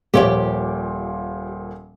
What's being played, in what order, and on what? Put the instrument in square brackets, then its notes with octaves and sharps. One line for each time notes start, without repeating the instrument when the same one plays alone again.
[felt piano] D#1 A#2 F3 [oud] G4 C#5 D5